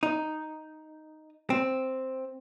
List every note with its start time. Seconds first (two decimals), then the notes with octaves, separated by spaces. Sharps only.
0.03 D#4
1.50 C4